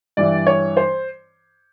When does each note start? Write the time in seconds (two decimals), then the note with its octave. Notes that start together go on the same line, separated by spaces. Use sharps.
0.17 G2 E3 D5
0.47 C#5
0.77 C5